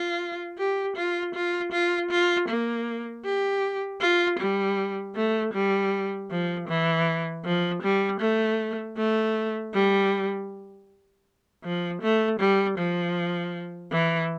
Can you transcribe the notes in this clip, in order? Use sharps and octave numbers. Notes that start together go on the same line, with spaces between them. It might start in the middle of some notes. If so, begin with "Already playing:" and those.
Already playing: F4
G4
F4
F4
F4
F4
A#3
G4
F4
G3
A3
G3
F3
E3
F3
G3
A3
A3
G3
F3
A3
G3
F3
E3